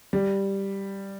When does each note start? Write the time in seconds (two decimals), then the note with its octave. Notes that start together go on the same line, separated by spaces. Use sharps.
0.13 G3